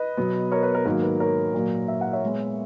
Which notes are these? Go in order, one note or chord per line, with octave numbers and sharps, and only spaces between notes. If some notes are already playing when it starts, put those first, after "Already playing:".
Already playing: B4 D#5
B2 F#3 B3
A#4 C#5
B4
A#4
G#2 D#3 F#3 A#3 A#4
B4
A#4 C#5
A#2 F#3 A#3
E5
F#5
C#5 E5
A#2 G#3 B3